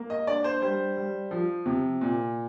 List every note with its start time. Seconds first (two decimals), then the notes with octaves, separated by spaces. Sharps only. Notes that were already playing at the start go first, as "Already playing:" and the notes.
Already playing: A#3
0.10 D#5
0.27 D4 D5
0.44 C5
0.62 G3 C5
0.97 G3
1.31 F3
1.66 C3
2.01 A#2